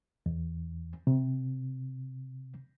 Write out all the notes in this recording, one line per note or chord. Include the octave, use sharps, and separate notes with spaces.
E2
C3